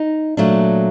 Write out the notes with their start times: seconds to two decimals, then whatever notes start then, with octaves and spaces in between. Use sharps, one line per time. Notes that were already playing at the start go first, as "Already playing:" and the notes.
Already playing: D#4
0.37 A#2 F#3 A3 D4